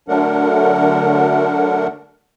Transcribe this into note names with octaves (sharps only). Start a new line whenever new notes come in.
D3 F#3 A3 D4 A#4 F#5